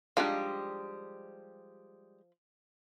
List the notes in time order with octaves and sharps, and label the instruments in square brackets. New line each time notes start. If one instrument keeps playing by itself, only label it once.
[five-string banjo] F3 [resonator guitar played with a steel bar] G3 G#3 G4 [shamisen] D4 D#4 F5